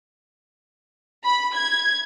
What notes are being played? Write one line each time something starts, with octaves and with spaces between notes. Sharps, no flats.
B5
G#6